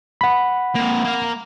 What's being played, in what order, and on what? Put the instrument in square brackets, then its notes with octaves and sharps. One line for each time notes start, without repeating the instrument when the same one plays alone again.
[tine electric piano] F#5 B5
[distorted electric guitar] A#3 C4
A#3 F5